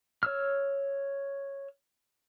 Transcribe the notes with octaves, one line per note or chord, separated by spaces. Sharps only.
C#5 E6 F6